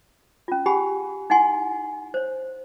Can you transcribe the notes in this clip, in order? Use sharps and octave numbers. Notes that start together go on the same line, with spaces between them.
C#4 F4
G4 G#4 F#5 G#5 B5
D#4 E4 F#5 G#5 C6
C5 C#5